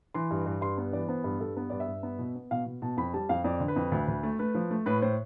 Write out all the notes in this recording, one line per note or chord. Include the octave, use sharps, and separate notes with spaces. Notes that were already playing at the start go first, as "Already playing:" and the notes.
E3 C6
G2
G2
G2 C6
B3
E3 D5
B3 C5
G2 B4
G2 A4
B3 B4
G2 D5
E5
G2
B3
B2
B3
B2 F5
B2
B2 A5
F2 B5
G3 A5
F2 F5
F2 D5
D3
B4
F2
D2
D2
A3
A3 B4
F3
A3
A2 B4
A2 C5